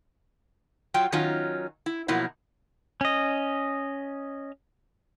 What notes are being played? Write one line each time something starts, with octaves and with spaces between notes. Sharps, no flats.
F#3 F4 G5
D#3 F#3 C#4 D#4 F4
E4
B2 F3 F#3 A#3 E4
C#4 D#5